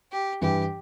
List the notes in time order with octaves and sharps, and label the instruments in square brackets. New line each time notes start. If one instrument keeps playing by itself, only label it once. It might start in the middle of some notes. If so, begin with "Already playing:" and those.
[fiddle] G4
[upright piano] G2 E3 G3 [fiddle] G4